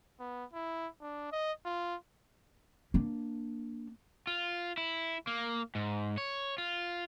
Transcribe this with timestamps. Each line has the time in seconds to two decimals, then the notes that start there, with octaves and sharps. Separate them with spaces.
0.20 B3
0.53 E4
1.01 D4
1.32 D#5
1.65 F4
2.94 A#3 D4
4.27 F4
4.77 E4
5.27 A#3
5.75 G#2
6.18 C#5
6.58 F4